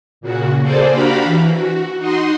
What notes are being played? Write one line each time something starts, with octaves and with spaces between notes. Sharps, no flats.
A#2 C#3 F#4
A#3 G#4 A4 C5 D5
D4 F#4 G4 F5 A#5 B5
E3
F#4
D#4 F#4 D#5 C6